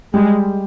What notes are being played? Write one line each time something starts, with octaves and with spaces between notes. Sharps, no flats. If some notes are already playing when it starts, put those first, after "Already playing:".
G3 G#3